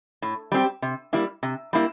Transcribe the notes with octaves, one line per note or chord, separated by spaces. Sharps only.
A2
G3 C4 G4
C3
G3 A#3 E4
C3
G3 A#3 E4